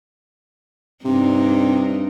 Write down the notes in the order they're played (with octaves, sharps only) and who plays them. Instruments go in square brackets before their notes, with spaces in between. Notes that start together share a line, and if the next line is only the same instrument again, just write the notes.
[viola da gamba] G2 D4 D#4 [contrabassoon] C3